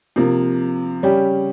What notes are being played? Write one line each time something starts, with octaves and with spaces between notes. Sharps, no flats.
C3 F3 A#3
C#3 G3 C#4 G4